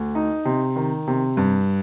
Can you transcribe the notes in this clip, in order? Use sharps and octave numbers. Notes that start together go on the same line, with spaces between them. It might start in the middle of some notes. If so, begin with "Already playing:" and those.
Already playing: D2
D#4
C3
D#3
C3
G2